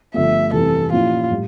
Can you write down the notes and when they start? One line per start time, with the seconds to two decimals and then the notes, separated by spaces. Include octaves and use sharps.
0.14 G1 G2 F3 A3 E5
0.53 F1 F2 E3 G3 A4
0.92 A#2 F3 C#4 E4 F4 G4
1.30 A2 G3